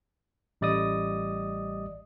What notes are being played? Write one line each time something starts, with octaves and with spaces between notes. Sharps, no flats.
A1 G3 D5 D#5 D#6